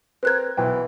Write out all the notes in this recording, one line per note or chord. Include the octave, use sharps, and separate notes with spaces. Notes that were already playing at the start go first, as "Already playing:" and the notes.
C4 A#4 B4 F#6 G#6
B1 E3 G5